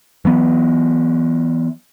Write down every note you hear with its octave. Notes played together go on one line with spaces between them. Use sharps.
E3 F#3 B3